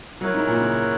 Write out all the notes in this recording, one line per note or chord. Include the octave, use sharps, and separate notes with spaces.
F#3 E4 A#4 C#5 F#5
G#2
A#2
C#3